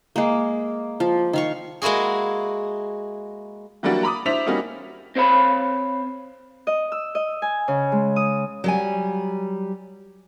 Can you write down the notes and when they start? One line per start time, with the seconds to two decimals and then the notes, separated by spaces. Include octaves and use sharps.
0.16 G#3 A#3
1.00 F3
1.33 D#3 F5 C#6
1.82 G#3 A#3 E4 F#4 G#4
3.83 E3 F#3 G3 A#3 D4 F#4
4.03 A#5 B5 D6 D#6
4.26 D4 E4 C5 E5 B6 F7
4.47 G3 A#3 C#4 D#4 F#4
5.16 C4 C5 C#5 F5 B5
6.67 D#5
6.92 E6
7.15 D#5
7.42 G#5
7.68 C#3
7.92 G#3
8.16 D#6
8.64 F#3 G3 G#5